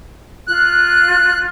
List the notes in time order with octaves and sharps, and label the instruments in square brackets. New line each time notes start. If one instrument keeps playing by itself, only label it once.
[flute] F4 [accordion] F#6